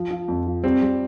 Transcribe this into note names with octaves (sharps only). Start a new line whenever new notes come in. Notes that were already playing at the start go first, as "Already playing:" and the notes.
Already playing: F3
F3
F2
F3
G3 C4
G3